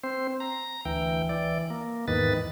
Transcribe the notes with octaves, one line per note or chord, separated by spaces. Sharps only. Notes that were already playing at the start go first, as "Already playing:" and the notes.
C4 C5
A#5
D2 E3 G5
E3 D5
A#3
E2 G#2 D#3 B4 A6